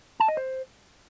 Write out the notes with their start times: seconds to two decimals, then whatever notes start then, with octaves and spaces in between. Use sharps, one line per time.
0.20 A5
0.28 D#5
0.37 C5